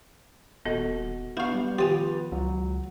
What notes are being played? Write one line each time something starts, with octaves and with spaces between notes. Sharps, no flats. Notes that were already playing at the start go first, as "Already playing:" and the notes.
D#1 B3 F#4 A4 D#5
B3 D4 E4 F5 C#6 G6
G3
D#3 F3 G4 G#5 D#6
C#2 F#3